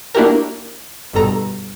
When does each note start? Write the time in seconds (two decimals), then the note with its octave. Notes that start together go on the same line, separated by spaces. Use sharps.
0.15 A#3 D4 E4 F#4 G4 A#4
1.13 G1 G2 B2 A4 A#5